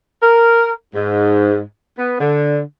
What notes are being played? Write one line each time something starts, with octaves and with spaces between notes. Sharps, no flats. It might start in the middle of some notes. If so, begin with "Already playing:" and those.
A#4
G#2
B3
D3